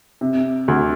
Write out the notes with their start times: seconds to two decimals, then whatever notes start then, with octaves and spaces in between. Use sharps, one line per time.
0.21 C3
0.68 D2